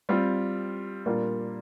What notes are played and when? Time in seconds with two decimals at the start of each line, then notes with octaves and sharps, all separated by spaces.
0.09 G3 C4 F4
1.06 A#2 G3 A#3 D4 F4